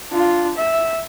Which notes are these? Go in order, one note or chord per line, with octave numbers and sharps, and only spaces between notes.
D4 F4
E5